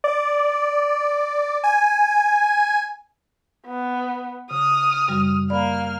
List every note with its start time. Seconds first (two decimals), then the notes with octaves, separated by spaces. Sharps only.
0.04 D5
1.64 G#5
3.66 B3
4.51 C#3 D#6 F6
5.08 F#2 C#3 G3
5.50 A#3 D5 B5 F6